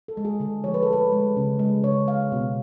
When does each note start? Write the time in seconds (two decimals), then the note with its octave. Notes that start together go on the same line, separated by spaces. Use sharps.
0.08 A4
0.17 G#3
0.25 G#4
0.40 D3 A4
0.64 F3 A3 C#5
0.74 B4
0.83 A4
0.88 D3 B4
1.12 G#3
1.37 C#3
1.59 G#3
1.83 C#3 C#5
2.08 G#3 F5
2.32 B2